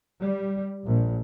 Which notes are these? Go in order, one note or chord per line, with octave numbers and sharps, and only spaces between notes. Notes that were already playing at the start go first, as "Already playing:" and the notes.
G3
A#1